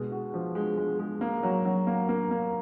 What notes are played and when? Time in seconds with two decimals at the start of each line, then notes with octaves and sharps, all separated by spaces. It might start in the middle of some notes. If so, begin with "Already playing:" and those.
Already playing: B2 G#3 B3
0.11 F#4
0.34 F3
0.55 G#3
0.77 G#3
0.99 G#3
1.21 A#3
1.43 F#3
1.65 F#3
1.87 A#3
2.09 A#3
2.31 A#3